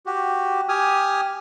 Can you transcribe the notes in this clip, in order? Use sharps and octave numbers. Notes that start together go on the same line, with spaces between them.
F#4 G4
G4 G#5 D#6 F6